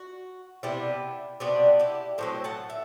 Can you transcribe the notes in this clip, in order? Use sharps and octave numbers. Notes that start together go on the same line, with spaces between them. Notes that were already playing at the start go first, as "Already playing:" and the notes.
Already playing: F#4
C3 G3 B3 D4 E4
C3 G3 B3 D4 F#4
E4 G4
A2 F#3 C4 A4 C5
F#5 A5
E5